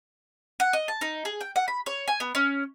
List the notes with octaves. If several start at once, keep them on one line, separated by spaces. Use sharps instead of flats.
F#5
D#5
A5
D#4
G#4
G5
F#5
B5
C#5
G#5
B3
C#4